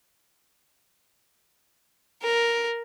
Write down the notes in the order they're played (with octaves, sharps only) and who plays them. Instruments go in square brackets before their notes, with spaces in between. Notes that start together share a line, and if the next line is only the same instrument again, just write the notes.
[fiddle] A#4